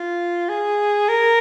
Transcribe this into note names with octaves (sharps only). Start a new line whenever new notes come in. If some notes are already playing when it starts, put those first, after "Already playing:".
Already playing: F4
G#4
A#4